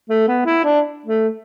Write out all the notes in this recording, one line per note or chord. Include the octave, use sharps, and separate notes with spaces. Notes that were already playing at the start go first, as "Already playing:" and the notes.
A3
B3
E4
D4
A3